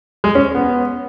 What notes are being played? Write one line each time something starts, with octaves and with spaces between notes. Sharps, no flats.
G#3
C#4
B3